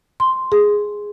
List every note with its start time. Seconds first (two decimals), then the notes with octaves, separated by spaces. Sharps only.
0.20 C6
0.52 G#4